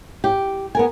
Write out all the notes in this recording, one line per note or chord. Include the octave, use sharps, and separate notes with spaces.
G4
B3 A#4 G#5